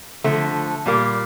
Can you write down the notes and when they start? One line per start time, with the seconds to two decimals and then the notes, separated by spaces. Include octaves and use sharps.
0.24 D3 F3 A3
0.86 A#2 G3 A#3